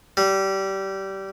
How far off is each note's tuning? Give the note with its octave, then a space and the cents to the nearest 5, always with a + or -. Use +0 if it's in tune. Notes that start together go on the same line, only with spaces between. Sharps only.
G3 -20